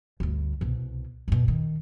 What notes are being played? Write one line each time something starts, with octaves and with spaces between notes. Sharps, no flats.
G1 D2
C2 B2
F#2 B2
D#3